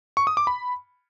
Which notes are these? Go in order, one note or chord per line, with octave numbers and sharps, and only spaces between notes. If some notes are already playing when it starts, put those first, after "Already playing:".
C#6
D#6
D6
B5